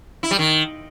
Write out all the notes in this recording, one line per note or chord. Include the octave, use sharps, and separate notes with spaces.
E4
G3
D#3